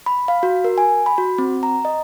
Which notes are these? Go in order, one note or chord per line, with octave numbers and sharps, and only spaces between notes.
B5
F5
F#4
A#4
G#5
B5
F#4
C4
A#5
D#5